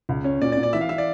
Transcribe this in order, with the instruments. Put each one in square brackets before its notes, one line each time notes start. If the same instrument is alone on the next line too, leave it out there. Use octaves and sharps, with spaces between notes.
[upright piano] C#2
C#4
[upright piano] A#2 [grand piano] D5
[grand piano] D5
[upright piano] A#2
[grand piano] D5
[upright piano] E3 [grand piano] E5
[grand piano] F5
[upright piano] E3 [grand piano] E5
[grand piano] D5